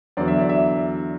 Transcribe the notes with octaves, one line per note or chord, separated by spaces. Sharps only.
E2 D3 F#3 D5
E5
D5
E5